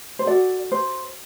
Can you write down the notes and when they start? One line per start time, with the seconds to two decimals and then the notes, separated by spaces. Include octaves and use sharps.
0.19 C5
0.26 F#4 A4 D5
0.72 C5